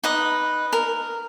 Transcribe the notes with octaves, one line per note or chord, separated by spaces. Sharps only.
D#4 B4 D#5 D#6
A#4